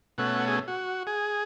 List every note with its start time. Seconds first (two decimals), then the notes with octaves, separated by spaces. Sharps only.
0.18 B2 A3 C#4 F#5
0.47 G#4
0.68 F#4
1.07 G#4